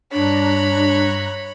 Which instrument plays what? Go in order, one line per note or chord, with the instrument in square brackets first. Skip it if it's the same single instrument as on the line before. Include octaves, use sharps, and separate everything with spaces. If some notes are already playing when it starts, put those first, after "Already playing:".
[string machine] G2 A#5 F#6 [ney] D4 [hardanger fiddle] C#5 B5